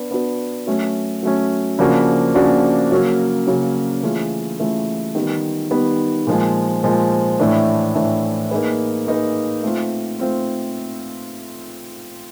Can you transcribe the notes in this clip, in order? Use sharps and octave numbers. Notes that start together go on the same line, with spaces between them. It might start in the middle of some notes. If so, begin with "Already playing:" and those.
Already playing: B3 D4 B4
B3 D4 F#4 B4
F#3 A3 C#4
F#3 A3 C#4
C#3 F3 A#3 D4 F#4
C#3 F3 A#3 D4 F#4
C#3 F#3 A#3 C#4
C#3 F#3 A#3 C#4
E3 A3 C#4 F4 G#4
E3 A3 C#4 F4 G#4
D#3 G3 B3
D#3 G3 B3
A#2 F3 G#3
A#2 F3 G#3
A2 E3 A3 D4
A2 E3 A3 D4
A#3 D#4 G#4 B4
A#3 D#4 G#4 B4
A3 C4 F4
A3 C4 F4